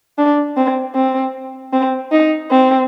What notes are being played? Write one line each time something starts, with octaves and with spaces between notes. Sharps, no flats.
D4
C4
C4
C4
D#4
C4